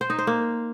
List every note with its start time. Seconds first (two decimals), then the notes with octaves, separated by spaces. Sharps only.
0.01 C5
0.10 D#4
0.19 C5
0.27 A#3